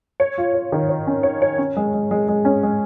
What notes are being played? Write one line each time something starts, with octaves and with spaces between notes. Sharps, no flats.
C#5
F4
C#5
D#3
C#5
C#4
C#5
C#5
C#4
G#3
G#3
G#3
G#3
C#4
G#3